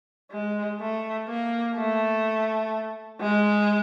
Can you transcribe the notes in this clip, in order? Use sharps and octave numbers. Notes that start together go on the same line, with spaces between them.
G#3
A3
A#3
A3
G#3